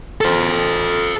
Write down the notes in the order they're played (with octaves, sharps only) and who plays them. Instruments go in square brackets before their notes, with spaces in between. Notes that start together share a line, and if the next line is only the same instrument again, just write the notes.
[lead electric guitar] A4 C5